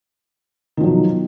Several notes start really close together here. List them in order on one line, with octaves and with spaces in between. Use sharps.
D#3 F3 F#3 B2